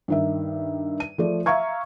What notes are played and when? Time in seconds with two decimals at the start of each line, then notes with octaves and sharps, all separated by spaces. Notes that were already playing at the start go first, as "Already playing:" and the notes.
0.08 G2 D#3 E5
1.00 D#7
1.18 F3 A3 D5
1.46 E5 F5 A#5 C#6 G#6